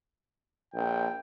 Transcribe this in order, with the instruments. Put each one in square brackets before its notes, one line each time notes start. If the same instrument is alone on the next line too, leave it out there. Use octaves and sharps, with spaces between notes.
[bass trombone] A#1 [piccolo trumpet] G5